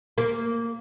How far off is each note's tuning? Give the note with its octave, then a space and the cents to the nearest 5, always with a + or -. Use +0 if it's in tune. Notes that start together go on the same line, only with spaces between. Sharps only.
A#3 -10